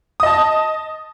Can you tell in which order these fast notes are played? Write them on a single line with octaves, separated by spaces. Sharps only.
D#6 D#5 A5